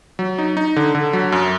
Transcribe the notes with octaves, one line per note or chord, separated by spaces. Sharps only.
F#3
D#4
D#4
D3
D3
F#3
F#2